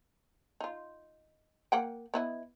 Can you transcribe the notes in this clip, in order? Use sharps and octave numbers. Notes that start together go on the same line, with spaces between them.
D#4 F4
A#3 F#5 G5
B3 E4 D#5